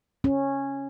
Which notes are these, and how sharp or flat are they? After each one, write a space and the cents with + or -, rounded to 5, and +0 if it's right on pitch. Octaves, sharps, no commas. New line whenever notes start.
C#4 -10